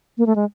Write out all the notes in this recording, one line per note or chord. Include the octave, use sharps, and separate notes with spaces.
A#3
A3
G#3